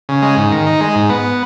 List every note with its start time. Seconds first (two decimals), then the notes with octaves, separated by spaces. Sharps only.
0.09 C#3
0.22 G#3
0.37 G#2
0.52 D#3
0.66 D#4
0.81 G#3
0.95 G#2
1.10 B3